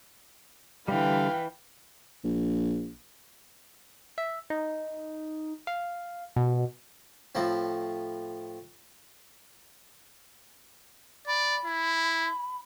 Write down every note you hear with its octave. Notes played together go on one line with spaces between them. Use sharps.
D3 E3 G3 B4 F5 G5
A#1
E5
D#4
F5
B2
A2 F3 C4
D5 B5
E4